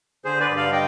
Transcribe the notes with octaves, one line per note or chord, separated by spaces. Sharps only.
D3 G#4 C5
B4 D5
G2
D5 F5
D3 D#5 G5